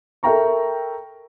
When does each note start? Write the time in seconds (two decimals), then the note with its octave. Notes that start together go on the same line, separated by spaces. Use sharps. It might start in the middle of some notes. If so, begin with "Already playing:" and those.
0.23 A4 A#4 E5 G5 A#5 C#6